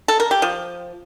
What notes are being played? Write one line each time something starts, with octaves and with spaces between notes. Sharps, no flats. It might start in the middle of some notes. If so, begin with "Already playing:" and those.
A4
A#4
G4
F3